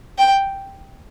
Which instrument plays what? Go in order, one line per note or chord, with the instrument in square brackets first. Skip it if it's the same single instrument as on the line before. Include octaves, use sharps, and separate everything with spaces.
[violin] G5